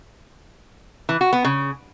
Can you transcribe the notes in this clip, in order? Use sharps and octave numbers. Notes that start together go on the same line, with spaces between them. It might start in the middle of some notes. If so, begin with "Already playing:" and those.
E3
F#4
B3
C#3